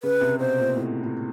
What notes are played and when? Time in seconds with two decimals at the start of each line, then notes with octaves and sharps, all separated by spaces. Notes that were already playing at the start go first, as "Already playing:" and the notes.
0.03 C#3 B4
0.21 C3
0.39 B2 C5
0.58 A#2
0.76 A2
1.03 A2